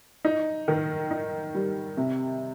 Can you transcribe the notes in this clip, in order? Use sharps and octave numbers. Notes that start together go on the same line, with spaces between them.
D#4
D#3
D#4
G3
C3